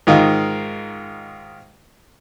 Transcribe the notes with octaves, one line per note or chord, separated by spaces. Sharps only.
G#2 D#3 F4